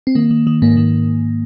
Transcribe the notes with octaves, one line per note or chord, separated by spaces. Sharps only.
C4
D#3 A#3
D#3
D#3
G#2 A#3
D#3